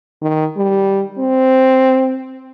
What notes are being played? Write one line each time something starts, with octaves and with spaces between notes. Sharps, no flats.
D#3
G3
C4